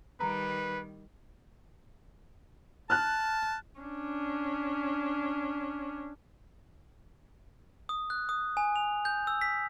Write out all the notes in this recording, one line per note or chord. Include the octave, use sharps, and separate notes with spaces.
D#3 G3 B4 A#5
A5 F6 F#6
C#4 D4
D#6
F#6
D#6
G#5
F7
G6
E6
B6